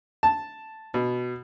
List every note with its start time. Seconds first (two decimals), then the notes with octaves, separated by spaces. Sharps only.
0.23 A5
0.94 B2